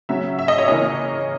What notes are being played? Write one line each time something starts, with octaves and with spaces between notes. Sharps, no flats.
C#3 F#3 C#4 E5
E5
D#5
C#5
C#3 E3 A#3 C#4 D#5